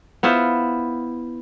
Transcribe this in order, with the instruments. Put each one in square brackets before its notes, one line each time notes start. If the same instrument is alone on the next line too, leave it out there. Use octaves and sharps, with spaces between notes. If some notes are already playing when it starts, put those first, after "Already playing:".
[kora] B3 E4 F4 C5